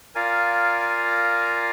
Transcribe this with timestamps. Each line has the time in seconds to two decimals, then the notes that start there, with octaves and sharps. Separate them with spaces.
0.15 F4 A#4 D5 F5 G#5